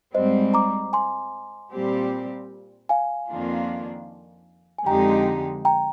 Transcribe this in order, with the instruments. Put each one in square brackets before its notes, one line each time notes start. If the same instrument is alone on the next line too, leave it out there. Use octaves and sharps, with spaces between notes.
[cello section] G#2 G3 C4 [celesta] C5 D#5
[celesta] A#5 D6
G#5 C6
[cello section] A#2 G3 C4 G4
[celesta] F5 G#5
[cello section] F2 D#3 A#3 D4 F4
[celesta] G#5
[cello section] F2 D3 G#3 D#4 G4 [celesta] G5 A#5
[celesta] G5 A#5